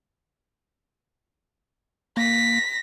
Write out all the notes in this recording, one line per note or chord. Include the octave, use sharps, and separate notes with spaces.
A#3 A#6 B6